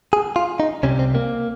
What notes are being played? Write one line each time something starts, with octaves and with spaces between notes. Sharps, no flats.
G#4
F4
D#4
C2 C3 G3 C#4
C4
A#3